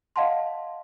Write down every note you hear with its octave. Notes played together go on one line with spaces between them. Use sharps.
D#5 F5 F#5 A5 C6